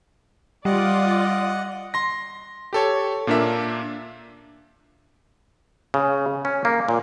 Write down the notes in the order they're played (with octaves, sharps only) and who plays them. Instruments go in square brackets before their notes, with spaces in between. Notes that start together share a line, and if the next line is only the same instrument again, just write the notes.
[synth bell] G3 [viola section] F4 D5 [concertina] D#5 F#5
[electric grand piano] C6 A#6
G4 A4 C#5
A#2 A#3 D4 A#4 E5
[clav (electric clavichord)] C#3
C#4
A#3
A#2